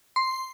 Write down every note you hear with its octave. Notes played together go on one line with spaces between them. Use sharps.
C6